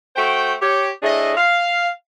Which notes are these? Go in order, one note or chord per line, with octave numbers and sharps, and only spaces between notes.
A3 F#4 C5 G5
G4 C#5
A2 A3 D4 G#4 D#5
F5